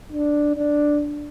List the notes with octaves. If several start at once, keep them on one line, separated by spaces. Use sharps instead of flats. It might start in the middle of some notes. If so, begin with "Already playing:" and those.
D4
D4